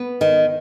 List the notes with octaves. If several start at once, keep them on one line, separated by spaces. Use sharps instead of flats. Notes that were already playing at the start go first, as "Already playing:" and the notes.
Already playing: B3
D#3